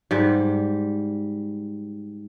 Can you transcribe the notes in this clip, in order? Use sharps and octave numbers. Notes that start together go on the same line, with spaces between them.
G#2 G3